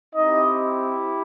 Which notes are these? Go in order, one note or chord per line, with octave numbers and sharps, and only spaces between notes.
C4 D#4 E4 G4 D#5